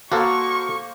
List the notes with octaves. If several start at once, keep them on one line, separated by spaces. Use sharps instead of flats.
A#3 F#4 A4 A#4 C5 C#6